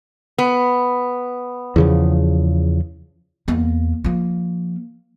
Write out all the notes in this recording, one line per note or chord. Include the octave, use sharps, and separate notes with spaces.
B3
E2 C#3 F3
E2 A#3
F3 A#3